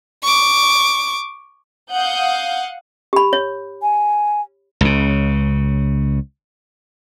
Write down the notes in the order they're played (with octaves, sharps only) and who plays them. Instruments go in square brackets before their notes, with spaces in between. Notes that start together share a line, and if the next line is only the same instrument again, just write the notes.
[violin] C#6 D6
[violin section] F5 F#5 D#6 G6
[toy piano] G4 B5
C#5
[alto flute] G#5
[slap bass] C#2 C#3